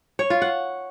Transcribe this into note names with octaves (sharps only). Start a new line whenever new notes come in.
C#5
F4
F#5